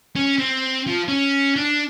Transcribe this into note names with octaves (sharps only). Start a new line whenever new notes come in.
C#4
C4
F3
C#4
D4